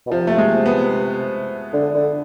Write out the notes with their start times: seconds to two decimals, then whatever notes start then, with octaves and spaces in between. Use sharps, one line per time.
0.07 B2
0.11 C3 F3
0.27 A3
0.38 G#3
0.66 B3
1.73 D3
1.94 D3